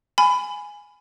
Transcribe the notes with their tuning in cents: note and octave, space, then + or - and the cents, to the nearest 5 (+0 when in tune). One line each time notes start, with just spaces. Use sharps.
G#5 +0 B5 +20